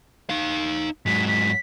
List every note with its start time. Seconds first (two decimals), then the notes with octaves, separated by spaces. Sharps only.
0.30 D#4 F5
1.06 G#2 F#3 B6
1.28 B6